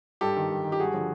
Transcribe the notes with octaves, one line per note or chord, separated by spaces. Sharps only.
G2 G4 A4
D#3
G2
D#3
G4
G2 F#4 G#4
D3 F3